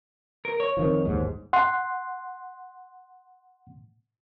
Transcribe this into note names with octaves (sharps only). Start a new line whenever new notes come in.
A#4
C#5
F2 D#3 F3
G1 D#2 G#2
F#5 C6